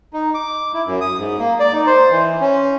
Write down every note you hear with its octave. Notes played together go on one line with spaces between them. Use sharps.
D#4
D6
E4
F#2
D#6
G#2
A#3
D5
D#4
C5
E3
C#4